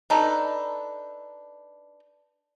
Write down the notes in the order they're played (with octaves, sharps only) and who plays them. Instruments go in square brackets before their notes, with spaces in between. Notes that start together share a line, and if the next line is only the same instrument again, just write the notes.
[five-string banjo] D4 D#4 A4 B4